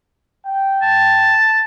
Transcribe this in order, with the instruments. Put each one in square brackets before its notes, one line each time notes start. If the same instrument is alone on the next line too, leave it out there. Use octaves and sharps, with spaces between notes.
[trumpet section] G5
[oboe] A5